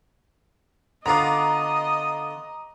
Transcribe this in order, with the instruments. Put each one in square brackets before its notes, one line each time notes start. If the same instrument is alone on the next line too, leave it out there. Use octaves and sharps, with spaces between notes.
[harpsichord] D3 B3 F4 [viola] D#5 [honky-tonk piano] A#5 D6